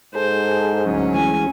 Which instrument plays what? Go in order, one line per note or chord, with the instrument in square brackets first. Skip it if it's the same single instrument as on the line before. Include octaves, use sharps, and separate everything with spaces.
[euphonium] G#2 [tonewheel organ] G#4 A4 [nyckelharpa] C5
[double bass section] D2 F#3 C#4
[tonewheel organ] E3 G#3 [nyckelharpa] G#5